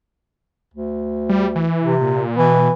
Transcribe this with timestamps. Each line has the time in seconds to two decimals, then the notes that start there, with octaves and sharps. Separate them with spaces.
0.74 D2
1.29 G3
1.55 E3
1.81 C3
2.01 A#2
2.37 B2 E3